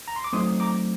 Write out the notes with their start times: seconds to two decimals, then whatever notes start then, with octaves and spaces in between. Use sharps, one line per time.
0.08 A#5
0.16 C6
0.24 D6
0.33 F#3 A3 C4 D#4 C6 D#6
0.60 A#5 D6